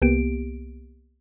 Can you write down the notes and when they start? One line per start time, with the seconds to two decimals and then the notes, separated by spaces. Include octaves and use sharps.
0.02 C2 A#3 B3 G4 D7